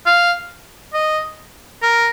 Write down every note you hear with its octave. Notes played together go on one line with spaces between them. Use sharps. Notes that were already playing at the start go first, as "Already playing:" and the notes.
F5
D#5
A#4